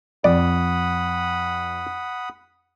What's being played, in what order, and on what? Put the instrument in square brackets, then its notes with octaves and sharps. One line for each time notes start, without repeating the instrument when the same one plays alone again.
[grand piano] F2 [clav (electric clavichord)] D5 [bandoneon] F#5 B5 D#6